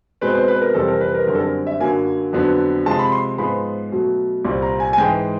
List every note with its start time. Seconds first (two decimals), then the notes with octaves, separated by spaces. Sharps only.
0.21 B2 G#3 C4 B4
0.35 C5
0.48 B4
0.61 A#4
0.74 F2 C3 E3 G3 C4 A4
0.88 A#4
1.01 B4
1.14 A#4
1.27 F#2 D3 G3 C4 A#4
1.35 A4
1.40 A#4
1.67 E5
1.80 F#2 D3 F#3 A#3 G#5
2.33 F2 D3 F#3 B3
2.86 C3 F3 G#3 A5
2.99 B5
3.12 C6
3.38 G#2 F3 G#3 B3 B5
3.92 B2 F#3 A3
4.44 C2 A#2 G3 C4
4.62 A#5
4.80 G#5
4.93 G#5
4.98 G#2 E3 G#3 G5